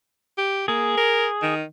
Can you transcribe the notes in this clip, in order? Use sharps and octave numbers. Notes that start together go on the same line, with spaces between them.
G4
A#3 G#4
A#4
D#3